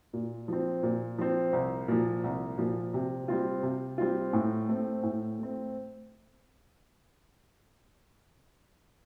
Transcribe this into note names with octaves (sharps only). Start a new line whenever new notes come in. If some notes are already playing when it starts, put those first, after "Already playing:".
A#2
F3 C4
A#2
F3 C4
C2
A#2 F3
C2
A#2 F3
C3
G3 C4 F4
C3
G3 C4 F4
A2
A3 C4
A2
A3 C4